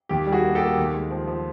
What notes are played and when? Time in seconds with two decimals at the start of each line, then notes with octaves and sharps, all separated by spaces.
0.09 D#2 G4
0.27 G3
0.32 F#4 G#4
0.44 A#3
0.55 G4 A4
0.61 A#3
0.77 D#2
0.94 G#3
1.10 F3
1.27 F3